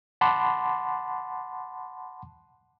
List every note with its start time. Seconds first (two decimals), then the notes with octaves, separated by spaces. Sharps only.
0.21 F#5 A5 B5 C6 D6